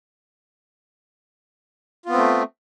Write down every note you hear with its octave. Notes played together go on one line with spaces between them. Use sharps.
A3 B3 C4 F4